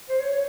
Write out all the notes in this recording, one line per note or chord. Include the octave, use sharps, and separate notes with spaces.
C5
C#5
C#5